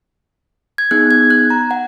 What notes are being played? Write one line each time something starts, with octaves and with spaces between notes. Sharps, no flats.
G#6
B3 D#4 G#4 F#6
G#6
F#6
A#5
F#5